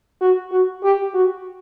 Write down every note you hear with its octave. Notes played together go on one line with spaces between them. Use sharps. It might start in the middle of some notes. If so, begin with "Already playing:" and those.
F#4
F#4
G4
F#4